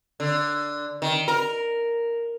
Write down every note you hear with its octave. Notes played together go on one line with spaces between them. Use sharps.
D3
D#3
A#4